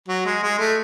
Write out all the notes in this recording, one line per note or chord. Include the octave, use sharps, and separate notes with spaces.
F#3
G#3
G#3
A3